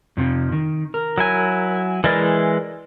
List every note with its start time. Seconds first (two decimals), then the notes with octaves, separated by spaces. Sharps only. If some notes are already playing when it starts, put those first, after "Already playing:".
0.17 F2 C3 F3
0.52 D#3
0.94 A#4
1.18 F#3 E4 G#5
2.04 E3 G#3 E4 A#4 D5 D#5